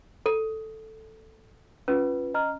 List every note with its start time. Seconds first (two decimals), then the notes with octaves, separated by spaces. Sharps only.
0.26 A4
1.88 C#4 F4 B4
2.34 D#5 A#5 F6